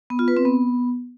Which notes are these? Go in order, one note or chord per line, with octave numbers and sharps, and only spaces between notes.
B3
F4
B4
C4
B3